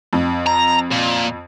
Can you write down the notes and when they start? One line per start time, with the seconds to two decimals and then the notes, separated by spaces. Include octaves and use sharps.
0.13 F2
0.47 A#5
0.92 A#2